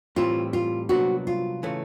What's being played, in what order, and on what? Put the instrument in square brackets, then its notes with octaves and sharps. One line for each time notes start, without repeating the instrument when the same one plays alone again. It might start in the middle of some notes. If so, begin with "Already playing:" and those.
[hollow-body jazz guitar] A2 E3 G3 C4 [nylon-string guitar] F4
[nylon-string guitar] F4
[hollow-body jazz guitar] C2 A#2 F#3 B3 D4 [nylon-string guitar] F#4
[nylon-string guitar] F4
[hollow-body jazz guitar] C#3 E3 A3